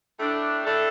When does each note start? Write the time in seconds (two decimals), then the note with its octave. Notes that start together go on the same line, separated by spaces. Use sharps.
0.19 A2 A3 D4
0.65 A2 A3 D4 A4